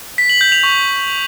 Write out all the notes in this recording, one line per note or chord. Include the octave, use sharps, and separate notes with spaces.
B6
F#7
G6
F7
C#6